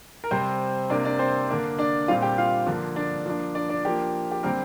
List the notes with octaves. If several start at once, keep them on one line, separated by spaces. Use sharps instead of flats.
A#4
C3 G3 C4 C5
C3 A#3 D4 D5
D4 D5
C4 C5
D3 A#3 D4
D4 D5
A#2 G3 C4 F4 F5
G4 G5
F4 F5
D3 F3 A#3 D4
D4 D5
F3 A#3 D4
D4 D5
D4 D5
F3 A#3 D4 G4
G4
D3 G3 A#3 C4 A#4